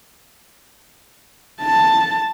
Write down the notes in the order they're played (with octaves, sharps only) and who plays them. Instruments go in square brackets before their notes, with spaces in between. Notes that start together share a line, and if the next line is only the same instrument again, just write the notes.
[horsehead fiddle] A5